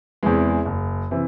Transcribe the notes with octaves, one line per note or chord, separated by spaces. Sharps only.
E2 C3 E3 G#3
F#1
C3 E3